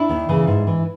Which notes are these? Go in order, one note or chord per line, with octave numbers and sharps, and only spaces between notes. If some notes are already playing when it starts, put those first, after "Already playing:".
Already playing: D4 E4
D#2
C#3 E3
G#2
E3